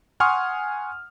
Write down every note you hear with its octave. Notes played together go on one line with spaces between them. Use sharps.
F#5 G#5 C6 C#6 D#6 F6